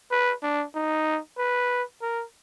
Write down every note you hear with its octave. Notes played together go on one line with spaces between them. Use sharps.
B4
D4
D#4
B4
A#4